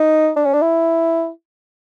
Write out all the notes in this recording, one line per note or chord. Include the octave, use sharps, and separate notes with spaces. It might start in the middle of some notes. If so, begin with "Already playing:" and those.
Already playing: D#4
D4
C#4
D4
E4